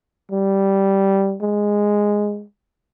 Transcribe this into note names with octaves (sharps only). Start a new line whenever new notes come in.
G3
G#3